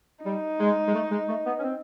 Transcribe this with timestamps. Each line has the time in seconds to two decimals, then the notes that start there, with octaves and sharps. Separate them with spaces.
0.25 G3 D#4
0.60 G#3
0.88 G#3
0.95 A3
1.11 G#3
1.29 A3
1.46 B3
1.60 C#4
1.63 C4